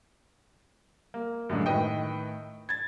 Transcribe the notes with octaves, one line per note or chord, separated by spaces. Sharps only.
A#3
F#2 A2 D3 G#3
A2 D#3 B4 D#5 G5
G#6 A6